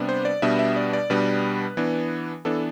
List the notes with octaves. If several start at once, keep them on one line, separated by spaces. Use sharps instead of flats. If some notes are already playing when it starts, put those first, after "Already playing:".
Already playing: C3 G3 B3 D4
C5
D5
B2 G3 B3 D4 E5
E5
D5
D5
B2 G3 B3 D4 B4
E3 B3 D4
E3 B3 D4 A4